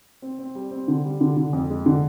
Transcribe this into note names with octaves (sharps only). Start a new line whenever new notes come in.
C4
C4
G3
C4
D3
G3
D3
D3
F2
G#3
D3